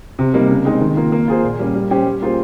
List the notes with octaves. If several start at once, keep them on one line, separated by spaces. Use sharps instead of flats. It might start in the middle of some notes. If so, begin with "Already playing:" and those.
C3
G3 A#3 D#4
C#3
G#3 C4 D#4
D#3
A#3 F4
A#3
F4 G#4 C5
A#2
G3 A#3 C#4
G3
C#4 G4 C5
G3
A#3 F4 G#4 C5